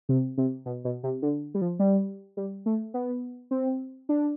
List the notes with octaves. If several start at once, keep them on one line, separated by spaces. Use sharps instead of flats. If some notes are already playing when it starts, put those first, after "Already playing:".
C3
C3
B2
B2
C3
D3
G3
F3
G3
G3
A3
B3
C4
D4